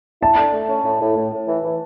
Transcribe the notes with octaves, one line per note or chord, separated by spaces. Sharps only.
E4 A5
D3
A3
C#4
A2
A2
A2
A2
E3
E3